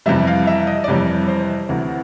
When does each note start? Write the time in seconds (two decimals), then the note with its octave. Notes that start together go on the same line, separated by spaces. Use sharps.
0.06 F2 C3 E3 G3 E5
0.27 F5
0.47 E5
0.67 D#5
0.84 D5
0.88 F2 C3 E3 G3 C#5
1.28 C5
1.69 D2 C3 E3